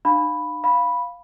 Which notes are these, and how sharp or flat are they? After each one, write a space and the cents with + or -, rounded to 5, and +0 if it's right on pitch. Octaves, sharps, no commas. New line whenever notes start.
D#4 -45 F5 +15 B5 +0
F5 +0 B5 -5